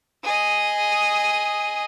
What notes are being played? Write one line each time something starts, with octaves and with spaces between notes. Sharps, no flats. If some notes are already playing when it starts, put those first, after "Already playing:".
G#4 D#5